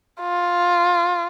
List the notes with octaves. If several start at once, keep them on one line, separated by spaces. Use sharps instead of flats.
F4